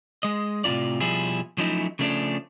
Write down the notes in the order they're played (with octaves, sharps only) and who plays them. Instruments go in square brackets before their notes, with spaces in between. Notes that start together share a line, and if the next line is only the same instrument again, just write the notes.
[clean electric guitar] G#3 D#5
A2 C3 D#3 F4 D5
B2 F3 G3 E4 G#4
F3 F#3 A3 C#4 D#4 E4
C#3 F3 A3 C#4 D4